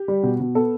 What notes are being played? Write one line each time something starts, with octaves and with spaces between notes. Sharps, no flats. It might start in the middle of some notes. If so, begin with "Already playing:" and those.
Already playing: G4
G3
B2
B2
B3 A4